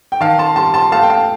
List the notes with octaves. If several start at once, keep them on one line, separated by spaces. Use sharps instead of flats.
G5
D#3 F5 A5
A5 C6
G3 A5 C6
A5 C6
A3 F5 A5
G5
F5 A5